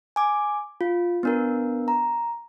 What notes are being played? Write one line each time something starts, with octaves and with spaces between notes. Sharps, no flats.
G#5 D6
F4
B3 D4 A#4
A#5